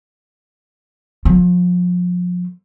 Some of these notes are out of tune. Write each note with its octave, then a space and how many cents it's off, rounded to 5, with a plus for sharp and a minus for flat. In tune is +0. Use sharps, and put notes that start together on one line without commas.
F3 +35